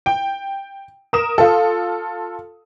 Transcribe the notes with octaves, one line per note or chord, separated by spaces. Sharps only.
G5
A#4 D#6 E7
F4 A4